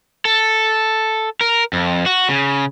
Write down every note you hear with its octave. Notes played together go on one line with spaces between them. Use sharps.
A4
A#4
F2
F#4
C#3